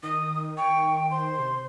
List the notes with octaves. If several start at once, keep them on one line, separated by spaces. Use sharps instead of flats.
D#3 D#6
G5 C#6
C5 C6
C3